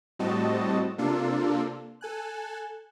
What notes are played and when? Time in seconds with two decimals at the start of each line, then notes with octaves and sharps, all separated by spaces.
0.19 A2 G3 C4 F#4 D#5 A5
0.98 C3 A#3 D4 F4 A4
2.01 A4 G#5 F#6